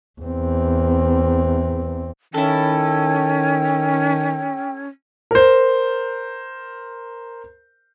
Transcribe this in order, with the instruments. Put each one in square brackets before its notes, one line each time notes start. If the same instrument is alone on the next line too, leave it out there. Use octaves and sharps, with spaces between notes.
[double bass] E2 C4
[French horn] D#3 [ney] C#4 [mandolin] E4 A4 [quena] G5
[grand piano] A#4 C5